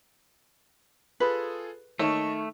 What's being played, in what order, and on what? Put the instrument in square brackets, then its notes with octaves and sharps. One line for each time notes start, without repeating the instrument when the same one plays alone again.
[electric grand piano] F4 G#4 A4 [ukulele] B4
[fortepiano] D#3 C#5 [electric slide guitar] A3 [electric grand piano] D#5 E5 A5